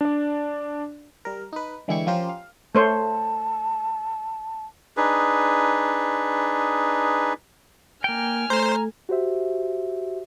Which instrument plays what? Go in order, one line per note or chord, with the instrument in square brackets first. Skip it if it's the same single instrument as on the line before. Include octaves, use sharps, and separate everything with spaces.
[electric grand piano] D4 D5
[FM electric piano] G3 A#4
D#4 B4
D3 E3 G#3 E4 G4 C#6
F3 C#4 F4 G4 A#4 C5
F5
[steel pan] A3 C5 C#5 [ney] A5
[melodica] D4 D#4 G#4 B4
[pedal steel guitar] A#3 G5 [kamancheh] G#5 F6
[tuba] A3 [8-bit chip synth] C5 [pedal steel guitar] A#5
[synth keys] F#4 G4 C5 E5